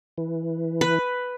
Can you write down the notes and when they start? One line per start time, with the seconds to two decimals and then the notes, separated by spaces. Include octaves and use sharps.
0.18 E3
0.81 B4